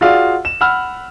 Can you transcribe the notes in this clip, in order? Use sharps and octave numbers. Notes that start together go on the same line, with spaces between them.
F4 F#4 G#4 D5 F5 E6
E7
F#5 B5 E6 F6